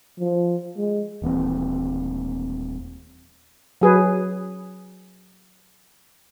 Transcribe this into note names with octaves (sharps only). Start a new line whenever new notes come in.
F3
G#3
D#1 E3 A#3 C4
F#3 G#4 B4